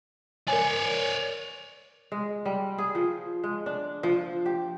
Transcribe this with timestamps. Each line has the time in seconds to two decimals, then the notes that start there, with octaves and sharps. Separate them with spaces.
0.48 A#4 C#5 D5 G#5
2.12 G#3
2.45 G3
2.78 G#4
2.95 F3
3.44 G#3
3.66 D4
4.03 F3
4.46 G4